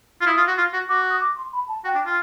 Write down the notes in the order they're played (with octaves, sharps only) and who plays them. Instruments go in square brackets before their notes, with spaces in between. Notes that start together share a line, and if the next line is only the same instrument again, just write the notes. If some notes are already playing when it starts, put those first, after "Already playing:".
[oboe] F4
[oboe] E4 [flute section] D#6
[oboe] F4
F#4
F4
F#4
[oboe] F#4 [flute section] D6
[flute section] D#6
D6
C6
B5
A5
[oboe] F#4 [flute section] G5
[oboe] D4
F4